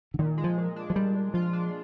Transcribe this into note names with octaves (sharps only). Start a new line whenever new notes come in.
D3
A#2 D#3
G#3
F3
A#2
D4
F3
A#2 G3
A#2
F3 F4
D4